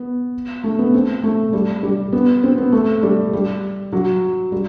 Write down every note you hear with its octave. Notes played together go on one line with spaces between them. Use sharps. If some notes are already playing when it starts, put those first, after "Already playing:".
Already playing: B3
A3
B3
C4
A3
G3
G3
B3
C4
B3
A3
G3
G3
F#3
G3